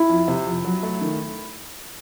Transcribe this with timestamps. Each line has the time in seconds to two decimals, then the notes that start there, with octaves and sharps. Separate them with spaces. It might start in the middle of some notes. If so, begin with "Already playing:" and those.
Already playing: E4
0.10 F2
0.28 C3
0.46 F2
0.65 F#3
0.83 A3
1.01 D#3